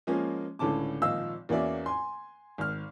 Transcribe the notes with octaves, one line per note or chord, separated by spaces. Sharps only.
F3 G#3 A#3 C#4
C#2 A2 D3 C#4 A5 D6
G#1 A#2 F3 D#5 F5 E6
E2 A#3 C#4 F#4 D5 E5
G#5 C6
G#1 F6